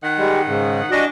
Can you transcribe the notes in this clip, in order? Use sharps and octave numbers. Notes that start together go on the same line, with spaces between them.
D#3 F#5
G3 G#3
G#2 C#3
E3 G3 D4 F#4 D#5